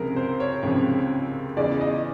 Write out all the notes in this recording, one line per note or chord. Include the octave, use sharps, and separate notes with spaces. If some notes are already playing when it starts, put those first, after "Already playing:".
Already playing: C#2 C3 F3 G#4 A#4
C5
C#5
C#2 C3 F3
E2 C#3 E3 D5
D#5